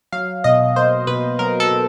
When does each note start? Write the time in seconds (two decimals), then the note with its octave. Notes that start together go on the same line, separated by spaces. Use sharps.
0.12 F#3 F5
0.44 B2 D#5
0.76 A#3 C5
1.07 B2 B4
1.39 F#3 A#4
1.60 A4
1.71 B2